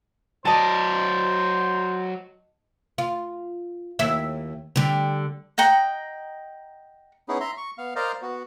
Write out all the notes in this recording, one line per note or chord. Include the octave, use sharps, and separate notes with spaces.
F#3 C5 D5 D#5 A5
F4
D#2 E4 E5
D3 G3
D#5 F#5 G5 A#5
B3 C#4 D#4 E4 G#4
E5 A#5 C6
C#6
B3 F5
A#4 C5 D5 D#5 F5
B3 F#4